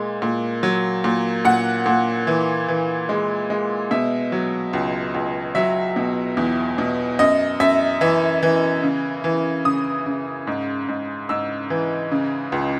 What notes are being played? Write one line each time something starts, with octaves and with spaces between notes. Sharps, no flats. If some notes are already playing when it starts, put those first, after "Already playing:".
Already playing: A#2 G#3
A#2
F#3
A#2
A#2 F#5
A#2
E3
E3
G#3
G#3
B2 E5
F#3
C#2
C#2
F#3 E5
B2
E2
B2
F#2 D#5
F#2 E5
E3 E5
E3
C#3
E3
C#3 D#6
C#3
G#2
G#2
G#2 E6
E3
C#3
C#2